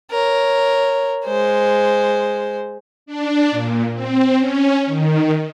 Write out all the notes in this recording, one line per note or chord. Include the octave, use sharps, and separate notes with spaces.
A#4 C#5
G#3 C5
D4
A#2
C4
C#4
D#3